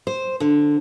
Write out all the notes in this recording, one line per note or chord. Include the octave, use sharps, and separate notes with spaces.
C5
D3